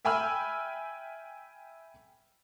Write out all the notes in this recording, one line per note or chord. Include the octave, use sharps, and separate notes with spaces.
E5 G5 G#5 B5 E6 F6